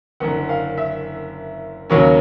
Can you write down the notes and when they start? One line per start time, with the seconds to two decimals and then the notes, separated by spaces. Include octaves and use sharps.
0.20 F#1 F#2 D3 F#5
0.49 F5
0.78 E5
1.90 D#2 C#3 F#3 A#3 C#4